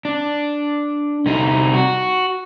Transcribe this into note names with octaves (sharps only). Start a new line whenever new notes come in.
D4
C2 D#4
F#4